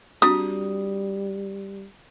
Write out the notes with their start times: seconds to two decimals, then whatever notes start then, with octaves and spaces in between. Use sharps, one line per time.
0.22 G3 C4 D4 F#4 D#6